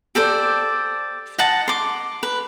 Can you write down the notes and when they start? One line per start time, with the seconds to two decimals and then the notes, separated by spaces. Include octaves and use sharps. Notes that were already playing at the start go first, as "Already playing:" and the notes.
0.15 G4 A4 C5 D5
1.38 D#5 F#5 A5
1.68 C6 D6
2.23 B4